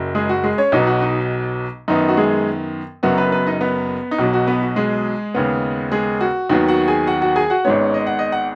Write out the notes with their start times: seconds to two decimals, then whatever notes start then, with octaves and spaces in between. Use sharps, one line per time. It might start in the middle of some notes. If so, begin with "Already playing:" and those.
Already playing: F#1 F#2 F#3
0.15 G#3 G#4
0.29 F#4
0.44 G#3 G#4
0.58 C#4 C#5
0.72 B1 B2 F#3 B3 D#4
0.87 F#4
1.01 D#4
1.88 F#2 D#3 B3 D#4
2.09 F#4
2.17 G#3 G#4
3.03 F#1 F#2 F#3 B3 F#4
3.18 B3 B4
3.32 B3 B4
3.47 D#4 D#5
3.61 B3 B4
4.11 D#4
4.19 B1 B2 F#3 F#4
4.33 F#4
4.47 B3 B4
4.62 F#4
4.76 G#3 G#4
5.34 D#2 C#3 B3
5.92 G#3 G#4
6.21 F#4
6.50 D#2 D#3 F#3 B3 F#4
6.68 F#4 F#5
6.88 G#4 G#5
7.07 F#4 F#5
7.22 F#4 F#5
7.36 G#4 G#5
7.50 F#4 F#5
7.65 G#1 G#2 G#3 B3 C#4 C#5
7.94 D#5
8.07 F#5
8.19 D#5
8.32 F#5